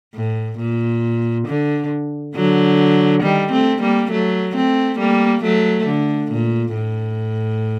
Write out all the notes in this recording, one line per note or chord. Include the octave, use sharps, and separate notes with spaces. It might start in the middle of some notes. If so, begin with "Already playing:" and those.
A2
A#2
D3
D3 F#3
D#3 G3
A3 C4
G3 A#3
F#3 A3
A3 C4
G3 A#3
F#3 A3
D3
A#2
A2